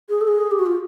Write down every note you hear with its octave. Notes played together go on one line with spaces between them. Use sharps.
G#4
A4
G#4
G4
F#4
F4